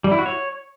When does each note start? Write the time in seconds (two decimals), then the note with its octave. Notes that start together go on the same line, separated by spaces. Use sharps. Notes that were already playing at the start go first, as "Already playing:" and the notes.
0.04 G3
0.11 E4
0.19 F#4
0.26 C#5